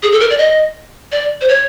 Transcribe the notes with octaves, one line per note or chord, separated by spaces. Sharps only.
G#4
A4
A#4
D5
D#5
D5
C5
C#5